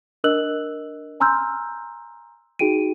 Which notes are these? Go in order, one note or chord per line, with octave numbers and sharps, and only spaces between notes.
D4 A#4 D#5 E6 F#6 F#7
G#5 A#5 C6 E6 F6 G6
D#4 F#4 G#4 G5 D7 D#7